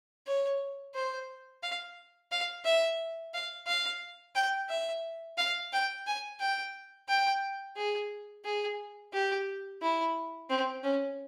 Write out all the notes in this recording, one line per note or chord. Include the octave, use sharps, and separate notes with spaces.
C#5
C5
F5
F5
E5
F5
F5
G5
E5
F5
G5
G#5
G5
G5
G#4
G#4
G4
E4
C4
C#4